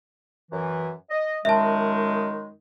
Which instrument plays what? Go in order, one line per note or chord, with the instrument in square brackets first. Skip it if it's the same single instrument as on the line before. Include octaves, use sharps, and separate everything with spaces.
[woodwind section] F#2 E3
D#5
[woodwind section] F#2 D#3 G#3 [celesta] E5 A5